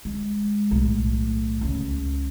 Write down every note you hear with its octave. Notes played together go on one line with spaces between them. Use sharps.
G#3
B1 A2
C#2 C#3